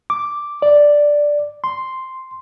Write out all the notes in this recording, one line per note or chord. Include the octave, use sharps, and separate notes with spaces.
D6
D5
C6